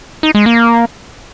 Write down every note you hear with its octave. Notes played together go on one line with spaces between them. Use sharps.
D#4
G#3
A#3